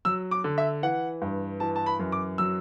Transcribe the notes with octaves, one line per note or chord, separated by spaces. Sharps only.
F#3 E6
D6
D3
E5
E3 F#5
G2
E3 A5
A5
B5
F#2
D6
F#3 E6